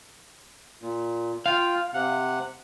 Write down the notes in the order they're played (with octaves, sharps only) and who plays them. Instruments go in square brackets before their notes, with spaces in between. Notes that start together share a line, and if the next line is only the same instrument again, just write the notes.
[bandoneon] A#2
[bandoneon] F4 G5 [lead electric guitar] F5
[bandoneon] C3 F#5